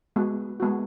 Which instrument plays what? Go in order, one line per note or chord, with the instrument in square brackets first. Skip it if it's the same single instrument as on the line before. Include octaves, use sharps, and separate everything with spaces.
[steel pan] G#3 B3 F#4
G#3 B3 F#4